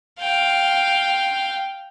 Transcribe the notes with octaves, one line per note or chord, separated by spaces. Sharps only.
F5 G5